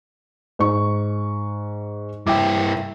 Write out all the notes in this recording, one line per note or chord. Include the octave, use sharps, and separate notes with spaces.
G#2 C#6
G2 E4 G5 D6